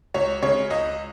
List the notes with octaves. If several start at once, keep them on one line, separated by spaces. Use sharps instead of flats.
C#2 C#5
C#3 G#3 C#5
C#2 D#5